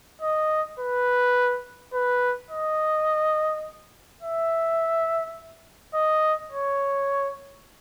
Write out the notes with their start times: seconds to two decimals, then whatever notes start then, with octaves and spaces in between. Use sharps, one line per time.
0.22 D#5
0.80 B4
1.94 B4
2.51 D#5
4.23 E5
5.94 D#5
6.51 C#5